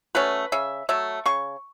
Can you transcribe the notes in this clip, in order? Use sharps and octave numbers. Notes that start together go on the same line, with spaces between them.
F#3 A3 C#4 B4
C#3 E5
F#3 A3 E5
C#3 C#6